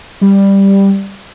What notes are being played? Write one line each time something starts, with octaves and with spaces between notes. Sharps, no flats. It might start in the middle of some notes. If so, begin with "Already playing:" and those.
G3